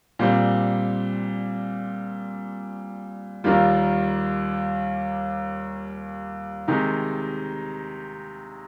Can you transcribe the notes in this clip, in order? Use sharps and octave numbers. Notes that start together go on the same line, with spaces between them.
A#2 G3 C4
D#2 D#3 G3 A#3 F4
C3 D#3 G#3 D#4